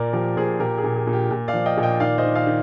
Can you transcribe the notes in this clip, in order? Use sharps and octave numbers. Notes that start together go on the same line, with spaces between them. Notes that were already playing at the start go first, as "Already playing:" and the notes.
Already playing: A#2 A#4 D5
F3 G4 A#4
A#2 G#4 C5
A#2 G4 A#4
G#4
A#2
G#4
A#2
G4
A#2
D5 F5
F3
D#5 G5
A#2
D#5 G5
D#3 D5 F5
C5 D#5
D#3
D5 F5
D#3